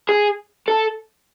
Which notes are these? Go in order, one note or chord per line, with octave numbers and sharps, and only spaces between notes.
G#4
A4